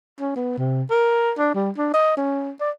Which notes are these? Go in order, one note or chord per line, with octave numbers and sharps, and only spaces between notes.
C#4
B3
C3
A#4
D4
G3
D4
D#5
C#4
D5